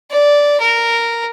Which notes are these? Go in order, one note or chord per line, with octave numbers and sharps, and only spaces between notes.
D5
A#4